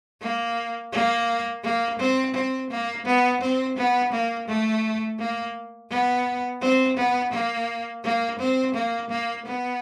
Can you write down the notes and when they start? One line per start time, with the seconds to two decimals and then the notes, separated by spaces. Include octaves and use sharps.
0.21 A#3
0.92 A#3
1.63 A#3
1.99 C4
2.34 C4
2.70 A#3
3.05 B3
3.41 C4
3.77 B3
4.12 A#3
4.48 A3
5.19 A#3
5.90 B3
6.61 C4
6.97 B3
7.32 A#3
8.04 A#3
8.39 C4
8.75 A#3
9.10 A#3
9.46 B3